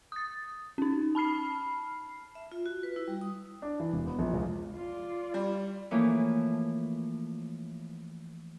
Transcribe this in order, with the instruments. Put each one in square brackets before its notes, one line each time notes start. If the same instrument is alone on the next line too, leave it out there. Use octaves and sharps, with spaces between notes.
[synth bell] D#6 A6
C#4 D#4
A5 B5 F6 C7
[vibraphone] E5
F4
F#4
B4
E4
G3
D#6
[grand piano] D4
E3
E1
B3
A#1
C#2
[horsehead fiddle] F4 D5
[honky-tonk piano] G3
[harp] E3 F3 A3 A#3 C#4